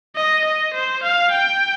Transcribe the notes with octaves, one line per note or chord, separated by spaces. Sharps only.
D#5
D#5
C5
F5
G5